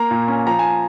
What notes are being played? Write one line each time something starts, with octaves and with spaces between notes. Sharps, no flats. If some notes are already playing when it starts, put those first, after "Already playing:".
Already playing: A#3 A#5
A#2
C#4
F3 A#5
G#5